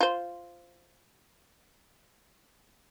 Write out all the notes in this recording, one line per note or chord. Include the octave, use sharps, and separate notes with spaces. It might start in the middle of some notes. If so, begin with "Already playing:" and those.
F4 C5